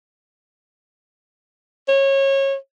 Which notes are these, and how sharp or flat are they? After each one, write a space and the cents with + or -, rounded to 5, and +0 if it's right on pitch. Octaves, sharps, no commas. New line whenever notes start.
C#5 -25